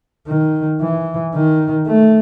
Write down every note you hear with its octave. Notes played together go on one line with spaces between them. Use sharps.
D#3
E3
D#3
A3